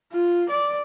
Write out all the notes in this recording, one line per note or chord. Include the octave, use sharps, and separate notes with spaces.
F4
D5